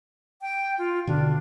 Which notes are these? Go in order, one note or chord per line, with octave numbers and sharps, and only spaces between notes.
G5
F4
B2 D3 D4